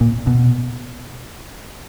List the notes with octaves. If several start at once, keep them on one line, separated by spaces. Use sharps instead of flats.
A#2
B2